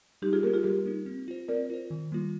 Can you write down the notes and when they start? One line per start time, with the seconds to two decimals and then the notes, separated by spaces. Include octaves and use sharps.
0.22 G3 D#4 G4
0.33 F4 G#4
0.43 A#3 D#4 G4 A#4
0.54 F4 G#4
0.64 G3 G4 A#4
0.86 A#3 D#4
1.06 C4
1.28 F4 C5
1.48 C4 A#4 D5
1.70 F4 C5
1.90 D#3
2.12 G3 A#3 F4